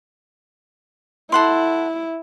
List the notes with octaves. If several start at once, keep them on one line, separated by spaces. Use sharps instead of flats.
E4 A4 F#5 C6